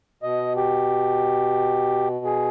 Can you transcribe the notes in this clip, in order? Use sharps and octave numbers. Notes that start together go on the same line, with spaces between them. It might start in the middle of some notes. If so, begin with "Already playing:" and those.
B2 D#5
G4
G#4